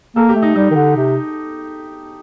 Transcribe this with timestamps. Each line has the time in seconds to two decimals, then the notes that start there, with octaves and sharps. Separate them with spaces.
0.16 A#3 A4
0.29 G4
0.35 A3
0.42 D#4
0.56 G3 D#4
0.71 D#3
0.75 D3
0.96 C3